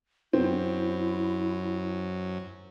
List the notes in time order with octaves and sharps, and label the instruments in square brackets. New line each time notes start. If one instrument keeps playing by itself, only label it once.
[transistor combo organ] F#2 [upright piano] C4 [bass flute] E4